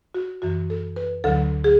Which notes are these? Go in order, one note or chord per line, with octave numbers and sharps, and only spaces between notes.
F#4
F#2 E3 F#4
A4
B4
D2 D3 F#3 A4
G#4